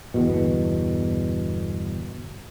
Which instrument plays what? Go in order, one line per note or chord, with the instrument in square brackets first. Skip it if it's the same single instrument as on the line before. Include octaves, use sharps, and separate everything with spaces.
[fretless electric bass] G1 E2 B2